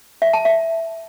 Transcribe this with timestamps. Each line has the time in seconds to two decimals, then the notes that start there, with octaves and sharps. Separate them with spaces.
0.22 E5
0.33 A5
0.45 E5